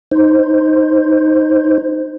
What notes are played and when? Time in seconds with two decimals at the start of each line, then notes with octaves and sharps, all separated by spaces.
0.11 D#4 C5